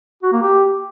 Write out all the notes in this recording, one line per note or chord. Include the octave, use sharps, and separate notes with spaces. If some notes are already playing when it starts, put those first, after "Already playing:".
F#4
A#3
G4